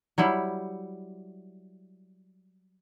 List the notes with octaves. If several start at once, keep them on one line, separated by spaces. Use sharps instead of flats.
F#3 G3 E4